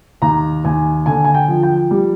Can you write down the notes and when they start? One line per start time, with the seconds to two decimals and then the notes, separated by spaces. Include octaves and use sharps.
0.22 D#2 A#5
0.64 D#2 G#5
1.06 D3 G#5
1.24 G#5
1.34 G5
1.48 F3
1.63 G5
1.91 G3